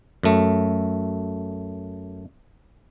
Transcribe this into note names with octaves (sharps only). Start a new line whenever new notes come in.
F#2 A3